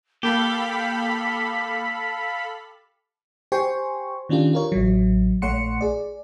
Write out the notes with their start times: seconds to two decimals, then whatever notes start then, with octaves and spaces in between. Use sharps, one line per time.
0.23 A#3 G4 A4 F5 B5 B6
3.52 G4 C5 G5 G#5 C6 C#6
4.29 D#3 C#4 D4 F4 G4
4.53 F4 A#4 C#5
4.72 A1 F#3
5.42 A#1 A3 C#5 F#5 C6 C#7
5.81 G#4 D5